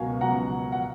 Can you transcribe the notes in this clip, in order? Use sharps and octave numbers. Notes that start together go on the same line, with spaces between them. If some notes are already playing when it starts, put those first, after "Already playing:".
Already playing: C#2 B2 F#3 F#4 A#4 F5 G#5
C#2 B2 F#3 F#5 A#5
F#5